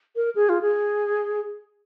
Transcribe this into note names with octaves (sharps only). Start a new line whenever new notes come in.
A#4
G#4
F4
G#4